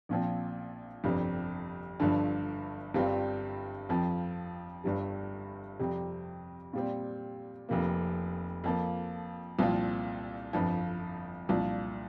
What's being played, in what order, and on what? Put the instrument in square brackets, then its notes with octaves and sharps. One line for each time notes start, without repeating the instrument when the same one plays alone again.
[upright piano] A#1 A#2 F3 C4
G1 F2 C3 G3
G1 G2 D3 F3
G1 G2 G3 C4 F4
F2 F3 C4
G1 G2 G3
F2 C3 G3 C4
A#2 G3 C4
F1 F2 C3 A#3
F2 F3 A#3
C2 A#2 F3 C4 F4
G1 F2 F3
C2 A#2 F3 D4 F4